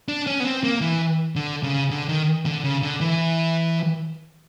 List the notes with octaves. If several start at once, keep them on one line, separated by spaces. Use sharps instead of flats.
D4
C#4
B3
C4
A#3
E3
D3
C#3
D3
D#3
D3
C#3
D3
E3